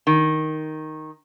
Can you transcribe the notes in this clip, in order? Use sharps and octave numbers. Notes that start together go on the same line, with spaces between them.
D#3